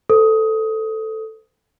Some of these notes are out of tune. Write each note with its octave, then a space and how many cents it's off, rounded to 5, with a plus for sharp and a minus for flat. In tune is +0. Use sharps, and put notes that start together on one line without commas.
A4 +0 C5 -40 D#6 +15